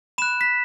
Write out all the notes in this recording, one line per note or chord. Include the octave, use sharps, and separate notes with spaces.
B5 F#6 E7
B6